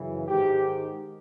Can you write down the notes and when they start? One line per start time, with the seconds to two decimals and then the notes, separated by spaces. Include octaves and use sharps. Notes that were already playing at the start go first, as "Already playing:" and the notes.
Already playing: F#2 C#3 E3
0.28 G#2 D#3 G4